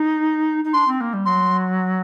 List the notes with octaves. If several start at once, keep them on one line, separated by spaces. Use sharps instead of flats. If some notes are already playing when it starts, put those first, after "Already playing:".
Already playing: D#4
D#4
D4 C6
C4
A#3
G3
F#3 C6